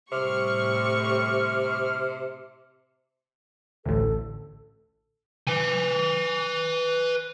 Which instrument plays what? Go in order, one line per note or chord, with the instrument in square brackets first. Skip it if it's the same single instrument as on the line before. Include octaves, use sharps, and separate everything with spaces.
[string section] A2 G3 C#6 [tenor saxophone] C3 [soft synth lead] F6
[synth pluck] A1 D2 [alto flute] A4
[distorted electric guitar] B4 G#5